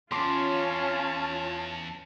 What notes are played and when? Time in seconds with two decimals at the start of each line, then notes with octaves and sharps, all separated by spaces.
0.11 E2 C#4 F4 A5 C6 D6